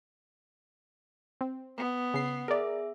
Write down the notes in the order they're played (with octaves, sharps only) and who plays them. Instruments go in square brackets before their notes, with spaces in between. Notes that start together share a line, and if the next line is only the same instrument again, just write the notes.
[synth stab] C4
[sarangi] B3
[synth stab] C#3 C7
[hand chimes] G#4 E5 [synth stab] A#4 D5